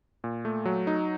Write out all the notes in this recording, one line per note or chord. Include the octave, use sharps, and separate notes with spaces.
A#2
A3
F#3
D#4